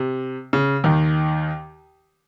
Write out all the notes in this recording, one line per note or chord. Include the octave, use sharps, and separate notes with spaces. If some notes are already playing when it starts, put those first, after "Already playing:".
Already playing: C3
C#3
D#2 D#3